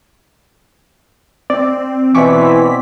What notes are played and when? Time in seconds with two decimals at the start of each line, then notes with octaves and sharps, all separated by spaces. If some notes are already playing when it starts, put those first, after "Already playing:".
1.50 C4 D5
2.15 B2 E3 C4 D5 G#5 C#6 D6 B6